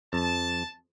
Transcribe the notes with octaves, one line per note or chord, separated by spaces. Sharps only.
F2 A5